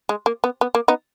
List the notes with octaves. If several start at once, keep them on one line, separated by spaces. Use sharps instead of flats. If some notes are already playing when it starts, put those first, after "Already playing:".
G#3
A#3
B3
B3
A#3
B3 D#4